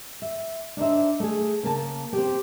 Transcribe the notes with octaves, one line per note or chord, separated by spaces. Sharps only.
E5
D4 D#4 C5 E5
A3 G#4
C#3 A#3 A5
C4 G4